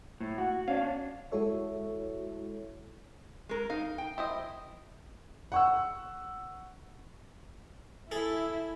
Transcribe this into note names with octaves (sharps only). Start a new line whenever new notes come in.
A2
F#4
C#4 D4 F5
G#3 E4 F#4 A4 C#5 E5
G#3 A#4
D#4 F5
G5
E4 C5 D#5
F#5 C#6 E6
E4 G#4 A4